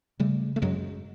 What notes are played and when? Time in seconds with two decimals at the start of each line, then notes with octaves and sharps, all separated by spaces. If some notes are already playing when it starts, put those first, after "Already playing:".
0.20 C#3 G3 A3
0.56 A3
0.62 F#2 F#3 G#3